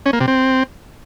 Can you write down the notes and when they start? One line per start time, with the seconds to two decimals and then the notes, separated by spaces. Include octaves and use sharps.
0.06 C#4
0.13 A#3
0.20 C3
0.28 C4